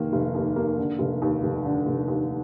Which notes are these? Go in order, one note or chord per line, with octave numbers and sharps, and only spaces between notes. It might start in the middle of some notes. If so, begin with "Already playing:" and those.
Already playing: F1 D#3 A#3
F1
D#2
A#3
D3
F1
D#2
F1
D3
F1
D#2